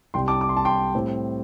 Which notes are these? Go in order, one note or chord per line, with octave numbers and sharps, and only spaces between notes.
C2 C3 G3 G5 C6
A5 D6
D6
C6
A5
G5 C6
A2 G3 C4